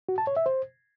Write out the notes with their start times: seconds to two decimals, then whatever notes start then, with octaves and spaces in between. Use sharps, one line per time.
0.09 F#4
0.18 A5
0.27 C#5
0.37 E5
0.46 C5